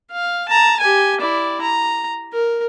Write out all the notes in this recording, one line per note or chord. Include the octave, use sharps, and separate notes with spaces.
F5
A5 A#5
G4 G#5
E4 D5
A#5
A#4